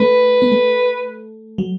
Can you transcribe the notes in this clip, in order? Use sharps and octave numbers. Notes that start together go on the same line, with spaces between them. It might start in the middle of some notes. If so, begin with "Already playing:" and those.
Already playing: A3 B4
B3
A3
F#3